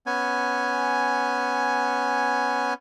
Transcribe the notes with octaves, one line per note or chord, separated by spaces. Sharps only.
B3 C#4 G#5